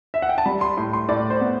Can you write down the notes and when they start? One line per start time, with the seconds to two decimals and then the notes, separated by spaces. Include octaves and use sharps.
0.14 E5
0.22 F#5
0.29 G5
0.38 A5
0.46 G3 B5
0.61 C6
0.77 A2 C6
0.93 C6
1.09 A2 D5
1.30 C5
1.41 B3